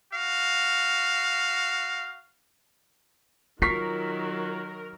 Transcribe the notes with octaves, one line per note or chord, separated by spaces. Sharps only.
F#4 F5
D#3 F#3 F4 A#4 C#6 B6 C7